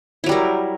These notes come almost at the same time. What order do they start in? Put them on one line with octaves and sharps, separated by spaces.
E4 F#3 G3 A#4